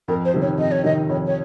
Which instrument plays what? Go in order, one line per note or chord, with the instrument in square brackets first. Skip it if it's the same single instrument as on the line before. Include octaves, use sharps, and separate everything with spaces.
[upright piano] F2 [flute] A#4
[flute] C5
[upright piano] C3 D#3
[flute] C#5
[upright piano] F2 [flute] D#5
[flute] C#5
[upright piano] C3 D#3 [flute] D#5
[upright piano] F2 [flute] C#5
[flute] C#5